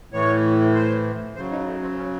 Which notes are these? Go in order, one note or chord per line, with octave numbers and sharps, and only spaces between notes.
A2 E3 C#5
C5
C#3 F#3 C5
D#4
A3
C4
C#4